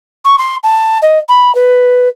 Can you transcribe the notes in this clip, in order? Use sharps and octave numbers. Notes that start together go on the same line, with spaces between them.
C#6
C6
A5
D#5
B5
B4